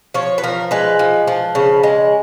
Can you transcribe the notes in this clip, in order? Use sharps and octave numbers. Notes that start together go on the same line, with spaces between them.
F3 C#5
B4
F3 A#4
G#3 B4
F3
F3
C#3
G#3